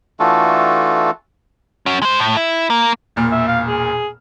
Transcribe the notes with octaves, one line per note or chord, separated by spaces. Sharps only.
E3 A3 D4 F4 F#4 A4
C#4 F#4
G#3 C5
A2
E4
A#3
E1 A#2 F6
E5
F5
G#4